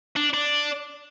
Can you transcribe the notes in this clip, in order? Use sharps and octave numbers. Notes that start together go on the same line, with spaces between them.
D4
D4